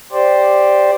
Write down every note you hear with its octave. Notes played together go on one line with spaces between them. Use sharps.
G4 C5 D5